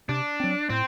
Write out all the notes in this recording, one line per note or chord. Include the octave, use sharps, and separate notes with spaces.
C3 D4
F#3 C4
A2 C4